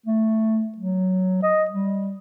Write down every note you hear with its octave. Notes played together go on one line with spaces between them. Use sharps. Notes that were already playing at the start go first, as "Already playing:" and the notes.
A3
F#3
D#5
G3